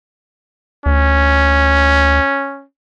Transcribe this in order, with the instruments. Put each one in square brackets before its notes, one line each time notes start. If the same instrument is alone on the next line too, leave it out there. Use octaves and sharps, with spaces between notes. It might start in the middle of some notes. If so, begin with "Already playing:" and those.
[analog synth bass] D2 [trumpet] C#4